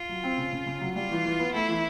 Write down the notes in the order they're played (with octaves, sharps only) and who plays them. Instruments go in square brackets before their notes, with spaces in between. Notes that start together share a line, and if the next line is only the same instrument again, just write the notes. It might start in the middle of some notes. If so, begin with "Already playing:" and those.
Already playing: [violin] F4
[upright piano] F#3
C4
C#3
C#3
C#3
F#3
[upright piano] G3 [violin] F4
[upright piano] E3
E3
B3
[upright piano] A3 [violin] E4
[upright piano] E3